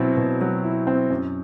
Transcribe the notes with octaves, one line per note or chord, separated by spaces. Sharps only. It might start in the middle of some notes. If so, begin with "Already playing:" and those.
Already playing: B2 F#3 C4 E4
B2
F#3
E4
C4
F#2